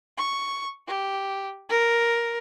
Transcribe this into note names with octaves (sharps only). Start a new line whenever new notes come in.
C#6
G4
A#4